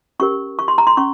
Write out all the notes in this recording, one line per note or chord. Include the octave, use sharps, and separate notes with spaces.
C#4 G4 A#4 C#6
C#6
C6
A#5
C6
C#4 C#6